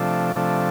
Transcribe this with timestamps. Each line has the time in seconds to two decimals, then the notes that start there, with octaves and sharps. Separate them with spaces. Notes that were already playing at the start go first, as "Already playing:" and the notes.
Already playing: C3 F3 A3 D4
0.36 C3 F3 A3 D4